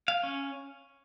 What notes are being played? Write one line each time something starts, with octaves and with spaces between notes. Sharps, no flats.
F5
C#4